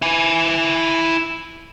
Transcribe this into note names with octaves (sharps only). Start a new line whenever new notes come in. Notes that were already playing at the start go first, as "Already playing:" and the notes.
E4 G#5